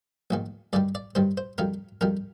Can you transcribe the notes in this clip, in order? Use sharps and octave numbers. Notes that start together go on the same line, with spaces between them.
A#1 G#2 D#3
G2 D#3 G3 D5
D5
G2 D#3 G3 C5
C5
F2 D#3 G3 A#4
F2 D#3 G3 A#4